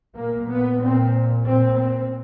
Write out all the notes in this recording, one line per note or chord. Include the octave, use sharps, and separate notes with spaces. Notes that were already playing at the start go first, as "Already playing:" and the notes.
A#2 A#3
B3
A#2 C4
A#2 C4
C4